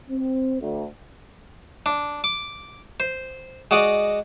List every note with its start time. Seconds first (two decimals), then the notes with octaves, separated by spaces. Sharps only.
0.11 C4
0.60 D2
1.86 D4
2.24 D6
3.00 C5
3.71 G#3 F#4 D5 D#5